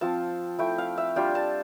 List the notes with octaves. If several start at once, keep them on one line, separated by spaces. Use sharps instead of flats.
F3 C4 F4 A5
F3 A3 E4 G5
F5
E5
G3 D4 F4 G5
A5